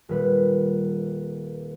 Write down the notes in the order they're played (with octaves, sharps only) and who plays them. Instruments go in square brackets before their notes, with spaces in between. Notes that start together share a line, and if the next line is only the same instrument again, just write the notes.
[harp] D#1 A#2 G3 B4